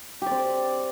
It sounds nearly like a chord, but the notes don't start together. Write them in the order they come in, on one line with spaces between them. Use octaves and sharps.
G4 D5 C4